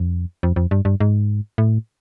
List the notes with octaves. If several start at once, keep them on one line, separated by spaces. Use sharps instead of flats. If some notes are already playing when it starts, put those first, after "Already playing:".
Already playing: F2
F2
F2
G2
G2
G#2
A2